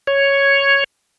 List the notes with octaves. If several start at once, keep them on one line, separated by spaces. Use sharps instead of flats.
C#5